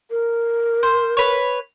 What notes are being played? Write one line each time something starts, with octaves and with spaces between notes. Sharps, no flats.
A#4
C5
B4 C#5